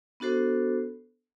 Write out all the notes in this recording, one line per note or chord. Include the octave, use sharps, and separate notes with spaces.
B3 D4 F#4 A4 C5